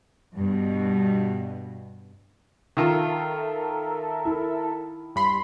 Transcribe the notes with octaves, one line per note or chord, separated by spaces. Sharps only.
G2 B2
D#3 F4 A4 A#4 E5
E4
G2 B5 C6